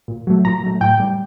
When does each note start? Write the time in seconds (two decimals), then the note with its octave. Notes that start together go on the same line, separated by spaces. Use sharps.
0.08 A#2
0.27 F#3 A3
0.45 A#2 A#5
0.64 F#3 A3
0.81 A2 G5
1.00 G3